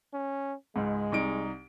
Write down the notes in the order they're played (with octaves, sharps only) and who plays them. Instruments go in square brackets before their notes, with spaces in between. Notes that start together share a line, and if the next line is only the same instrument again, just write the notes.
[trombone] C#4
[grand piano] C#2 G#2 [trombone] G#3
[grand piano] C2 D#4 D7